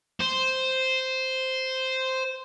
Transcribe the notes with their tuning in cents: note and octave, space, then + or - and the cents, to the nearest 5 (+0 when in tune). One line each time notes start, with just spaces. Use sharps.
C5 -5